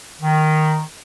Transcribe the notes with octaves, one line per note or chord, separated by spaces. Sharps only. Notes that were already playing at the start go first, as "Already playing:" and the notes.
D#3